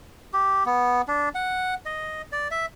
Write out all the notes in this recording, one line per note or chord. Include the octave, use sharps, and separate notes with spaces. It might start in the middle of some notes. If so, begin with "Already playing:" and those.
G4
B3
D4
F#5
D#5
D5
E5